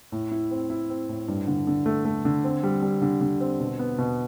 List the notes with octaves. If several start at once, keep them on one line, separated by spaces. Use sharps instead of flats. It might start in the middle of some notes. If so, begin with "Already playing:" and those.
A2
E4
C4
E4
C4
A2
G2
D3
D3
A3
A3
D3
C4
G3
G3
D3
D3
C4
B2
B3
B2